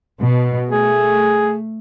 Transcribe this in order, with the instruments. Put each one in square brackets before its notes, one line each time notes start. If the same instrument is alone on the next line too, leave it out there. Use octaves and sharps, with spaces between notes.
[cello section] B2
[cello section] A3 [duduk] G#4